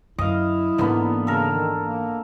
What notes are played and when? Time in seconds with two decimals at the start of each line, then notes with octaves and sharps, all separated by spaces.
0.18 F#2 D3 E4 D#5 F5
0.78 G#2 D3 E3 A#3 B3
1.27 C#3 A4 A#4
1.51 D#3
1.82 A#3